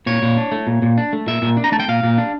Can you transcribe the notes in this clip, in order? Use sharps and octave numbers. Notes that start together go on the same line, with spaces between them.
A#2 C#5
A#2
D4
A3
A#2
A#2
D4
A3
A#2 E5
A#2
D4
A#5
A3 A5
G5
A#2 F5
A#2
D4